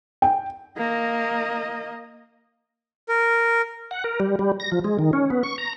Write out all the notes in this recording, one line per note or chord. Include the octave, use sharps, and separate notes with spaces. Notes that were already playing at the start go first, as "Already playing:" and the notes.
G5
A#3 D#5
A#4
F#5
A#4
G3
G3
A#6
F3
G#3
D#3
C#4
B3
C#6
A#5